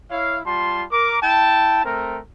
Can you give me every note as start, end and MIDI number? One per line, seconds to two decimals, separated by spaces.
0.10 0.39 64
0.10 0.39 73
0.10 0.39 77
0.45 0.84 55
0.45 0.84 65
0.45 0.84 81
0.45 0.84 84
0.91 1.20 70
0.91 1.20 86
1.22 1.84 64
1.22 1.84 79
1.22 1.84 81
1.84 2.19 57
1.84 2.19 60
1.84 2.19 70